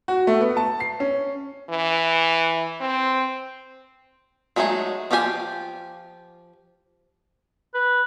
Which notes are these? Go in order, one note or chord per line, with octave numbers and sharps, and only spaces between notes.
F#4
A3
B3
A5
C7
C#4
E3
C4
F#3 G#3 A3 D#4 G#4
F3 F4 G4 A4 G#5
B4